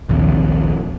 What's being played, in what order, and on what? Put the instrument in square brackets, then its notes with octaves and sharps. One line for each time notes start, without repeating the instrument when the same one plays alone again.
[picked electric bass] A#1 D#2 C3